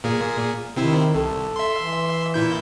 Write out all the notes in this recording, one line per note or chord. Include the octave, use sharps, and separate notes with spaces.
A#2 A#3 G#4
C3 D#3 C4 E4
C2 A4
E5 C6
E3
A#2 E4 G6